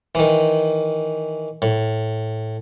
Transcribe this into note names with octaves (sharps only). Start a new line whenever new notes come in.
D#3 E3
A2